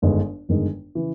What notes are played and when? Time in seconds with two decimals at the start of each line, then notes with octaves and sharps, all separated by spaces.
0.02 G1 G2 D#3 G#3
0.49 G1 G2 D#3 G#3
0.95 C#3 E3